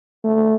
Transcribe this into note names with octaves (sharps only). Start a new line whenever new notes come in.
A3